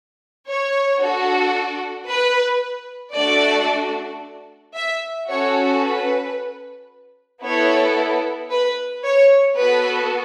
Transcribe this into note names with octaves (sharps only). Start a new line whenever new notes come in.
C#5
D4 F#4 A4
B4
A3 D4 F#4 A4 D5
E5
C#4 F#4 A4 C#5
B4
B3 E4 A4 C#5
B4
C#5
B3 F#4 A4 B4